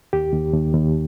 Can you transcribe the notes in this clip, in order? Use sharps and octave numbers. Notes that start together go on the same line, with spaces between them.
D#2 G4
D#2
D#2
D#2